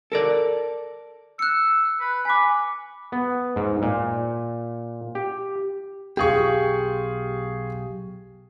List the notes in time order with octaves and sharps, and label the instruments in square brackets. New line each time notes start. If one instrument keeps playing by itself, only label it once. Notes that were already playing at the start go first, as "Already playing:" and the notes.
[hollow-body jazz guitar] A4 A#4 D5
[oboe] E6 [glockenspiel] F#6 C#7
[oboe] B4
[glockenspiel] G#5 D6 [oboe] B5
[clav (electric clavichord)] B3
G#2
A#2
G4
[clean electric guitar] B1 F#2 G4 [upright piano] F4 G#4 C#6